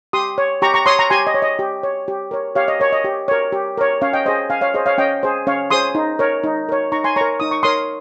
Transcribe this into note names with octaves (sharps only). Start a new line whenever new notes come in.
G4 C6 D#6
C#5
G4 A#5 C#6
A#5 C#6
C#5 C6 D#6
A#5 C#6
G4 G#5 C6
D#5
C#5
D#5
G4
C#5
G4
A#4 C#5
G4 C#5 F5
D#5
A#4 C#5
D#5
G4
A#4 C#5
G4
A#4 C#5
C#4 C#5 F5
D#5 G5
G#4 C5 D#5
C#4 F5 G#5
C#5 F5
G#4 C5 D#5
C#5 F5
C#4 D#5 G5
G#4 C5
C#4 C#5 F5
G#4 C5 C6 D#6
D#4
A#4 C#5
D#4
A#4 C#5
D#4 A#5 C#6
G#5 C6
A#4 C#5 A#5 C#6
D#4 D#6
C#6
A#4 C#5 C6 D#6